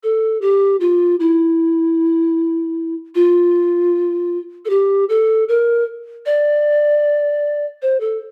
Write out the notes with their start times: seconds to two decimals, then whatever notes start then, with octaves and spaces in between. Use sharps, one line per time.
0.03 A4
0.41 G4
0.80 F4
1.20 E4
3.15 F4
4.65 A4
4.70 G4
5.09 A4
5.49 A#4
6.26 D5
7.82 C5
8.00 A4